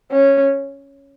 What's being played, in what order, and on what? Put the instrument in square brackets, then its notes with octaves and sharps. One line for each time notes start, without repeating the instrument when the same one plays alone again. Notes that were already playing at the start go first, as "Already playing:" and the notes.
[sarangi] C#4